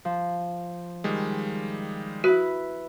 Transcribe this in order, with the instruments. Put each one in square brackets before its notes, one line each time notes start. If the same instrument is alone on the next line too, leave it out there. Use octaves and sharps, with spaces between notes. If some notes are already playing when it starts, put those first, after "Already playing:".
[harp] F3
[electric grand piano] D#3 G3 G#3
[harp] E4 B4 [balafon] F#4